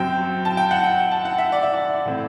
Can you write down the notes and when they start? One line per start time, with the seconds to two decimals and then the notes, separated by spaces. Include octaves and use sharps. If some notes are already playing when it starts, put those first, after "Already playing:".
Already playing: F#2 F#3 C4 G5
0.45 A5
0.57 G5
0.71 F#5
0.83 G5
1.11 A5
1.25 F#5
1.38 E5
1.52 D5
1.63 E5
1.74 D5
2.06 A2 E3 A3 C4